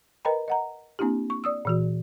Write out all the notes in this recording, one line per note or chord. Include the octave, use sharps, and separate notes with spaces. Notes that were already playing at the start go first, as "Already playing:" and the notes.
A#4 B4 D#5 G5 A#5 B5
D#5 F#5 A#5
A#3 C4 D4 E4 G4
C#6
D5 D#6 E6
A#2 E3 F#4